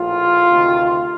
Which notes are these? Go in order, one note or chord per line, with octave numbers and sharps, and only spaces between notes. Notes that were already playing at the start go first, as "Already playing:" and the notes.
Already playing: A#1 A2 F4
D2 C3 D#3